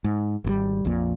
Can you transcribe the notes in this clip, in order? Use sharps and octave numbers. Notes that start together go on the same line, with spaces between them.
G#2
G#1 C3 G3
A#1 F2 A#2